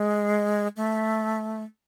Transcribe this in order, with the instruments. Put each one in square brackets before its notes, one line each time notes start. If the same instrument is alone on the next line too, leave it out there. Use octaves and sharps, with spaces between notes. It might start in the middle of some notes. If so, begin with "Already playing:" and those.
Already playing: [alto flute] G#3
A3